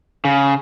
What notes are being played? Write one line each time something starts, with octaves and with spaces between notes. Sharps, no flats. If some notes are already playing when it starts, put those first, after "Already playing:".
C#3